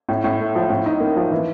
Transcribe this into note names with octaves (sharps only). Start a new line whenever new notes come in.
A2
A2
A3
F3
A2
D#4
A#3
F3
E3